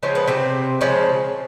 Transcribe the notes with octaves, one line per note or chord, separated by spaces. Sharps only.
C#3 F3 G#3 C4
B3
C3 C4
C#3 F3 G#3